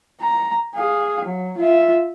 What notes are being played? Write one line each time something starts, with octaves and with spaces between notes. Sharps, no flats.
A#5
G#4 F5
F#3
F4 E5